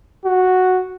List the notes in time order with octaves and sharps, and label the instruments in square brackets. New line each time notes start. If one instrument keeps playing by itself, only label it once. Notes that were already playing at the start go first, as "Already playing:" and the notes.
[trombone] F#4